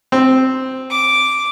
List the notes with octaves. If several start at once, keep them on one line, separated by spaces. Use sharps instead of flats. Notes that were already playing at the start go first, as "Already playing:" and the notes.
C4
D6